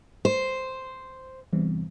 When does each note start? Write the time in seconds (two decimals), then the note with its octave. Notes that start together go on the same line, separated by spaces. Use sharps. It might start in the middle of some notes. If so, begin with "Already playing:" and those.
0.25 C5
1.53 E2 G2 C3